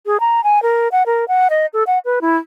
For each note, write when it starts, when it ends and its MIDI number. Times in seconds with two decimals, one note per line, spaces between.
0.06 0.17 68
0.20 0.43 82
0.44 0.62 80
0.62 0.88 70
0.92 1.03 78
1.06 1.25 70
1.28 1.48 78
1.50 1.66 75
1.73 1.83 69
1.87 1.99 78
2.05 2.19 71
2.21 2.37 64